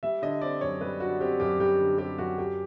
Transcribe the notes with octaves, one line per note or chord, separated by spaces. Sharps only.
G3 E5
D3 D#5
C4 D5
F#2 C#5
G3 B4
D3 F#4
C4 G4
F#2 G4
G3 G4
D3
C4 G4
F#2 F#4
F#3 G4